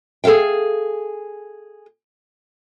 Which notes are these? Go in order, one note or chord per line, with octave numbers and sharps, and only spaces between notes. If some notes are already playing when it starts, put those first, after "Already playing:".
G#4 A4 C5 F5 G5